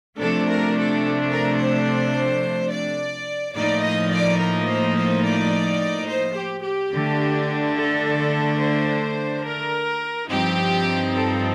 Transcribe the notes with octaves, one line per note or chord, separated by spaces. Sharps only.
C3 F3 A3 D4 A4
A#4
A4
A#4
C5
D5
A2 F3 A#3 D#4 D5
D#5
D5
A#4
C5
C5
D5
C5
G4
G4
D3 A3 D4
A4
C5
A#4
G2 F3 C4 D#4 G4
A4